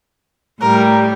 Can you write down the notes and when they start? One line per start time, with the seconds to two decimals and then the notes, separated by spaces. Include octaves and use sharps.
0.61 A2 G3 A#4